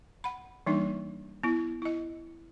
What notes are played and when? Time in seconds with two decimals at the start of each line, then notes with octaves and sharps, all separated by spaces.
0.24 F#5 B5
0.66 E3 G3 A#3 D4 D#4
1.43 B3 E4
1.82 E4 D#5